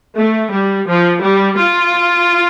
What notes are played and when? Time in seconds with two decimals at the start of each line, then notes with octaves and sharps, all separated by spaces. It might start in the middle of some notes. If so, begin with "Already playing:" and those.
0.17 A3
0.53 G3
0.88 F3
1.23 G3
1.58 F4